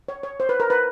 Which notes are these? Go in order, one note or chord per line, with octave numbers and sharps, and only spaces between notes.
C#5
C#5
C5
B4
A#4
B4